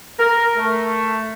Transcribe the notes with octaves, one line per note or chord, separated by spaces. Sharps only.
A#4
A3